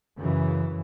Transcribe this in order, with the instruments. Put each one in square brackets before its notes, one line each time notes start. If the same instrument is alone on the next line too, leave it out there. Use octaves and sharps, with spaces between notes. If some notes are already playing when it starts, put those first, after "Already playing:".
[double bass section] F#2 C#3 E3